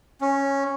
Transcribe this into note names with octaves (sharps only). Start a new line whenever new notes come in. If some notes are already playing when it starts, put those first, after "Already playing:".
C#4